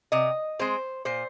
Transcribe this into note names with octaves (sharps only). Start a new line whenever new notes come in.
C3 D#5
G#3 C4 C5
A#2 C5